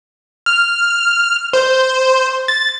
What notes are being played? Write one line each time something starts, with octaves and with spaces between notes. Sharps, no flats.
F6
C5
A6